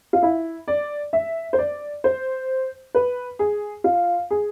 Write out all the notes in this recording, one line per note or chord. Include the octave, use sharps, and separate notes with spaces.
F4
E4
D5
E5
C5
D5
C5
B4
G#4
F4
G#4